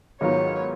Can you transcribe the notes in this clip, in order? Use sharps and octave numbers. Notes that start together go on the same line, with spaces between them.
G#2 D#3 F#3 B3 F4 C#5